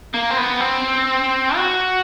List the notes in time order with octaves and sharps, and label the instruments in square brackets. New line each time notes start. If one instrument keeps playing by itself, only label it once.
[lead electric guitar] A#3
C4
B3
C4
F#4